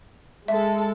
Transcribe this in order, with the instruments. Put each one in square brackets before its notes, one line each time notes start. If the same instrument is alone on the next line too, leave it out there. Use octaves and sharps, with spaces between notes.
[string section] G#3 A4 [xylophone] E5